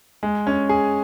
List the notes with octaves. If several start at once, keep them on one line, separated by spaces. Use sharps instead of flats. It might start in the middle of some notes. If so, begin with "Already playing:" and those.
G#3
C#4
G#4